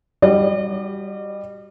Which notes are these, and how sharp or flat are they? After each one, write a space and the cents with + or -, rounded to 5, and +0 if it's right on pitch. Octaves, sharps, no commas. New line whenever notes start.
G3 +5 F#4 +0 D#5 -45